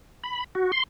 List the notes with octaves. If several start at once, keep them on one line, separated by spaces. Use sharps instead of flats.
B5
F#4
C6